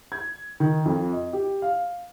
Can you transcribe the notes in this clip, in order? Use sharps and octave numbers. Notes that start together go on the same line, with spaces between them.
G#6
D#3
F2
D#5
G4
F5